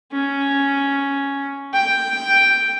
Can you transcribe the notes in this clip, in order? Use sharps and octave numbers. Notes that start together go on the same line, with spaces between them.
C#4
G5